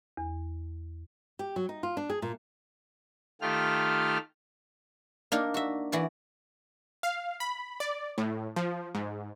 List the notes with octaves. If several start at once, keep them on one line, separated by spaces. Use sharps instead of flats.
E2
G4
F#3
D#4
F4
D4
G#4
A#2
D#3 A3 F4 G4 F6
A#3 D4 D#4 A#4
F#4 E5
E3 F#4 D5
F5
B5
D5
A2
F3
G#2